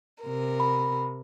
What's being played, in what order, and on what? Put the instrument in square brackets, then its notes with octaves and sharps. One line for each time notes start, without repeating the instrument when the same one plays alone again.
[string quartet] C3 A#4
[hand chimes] B5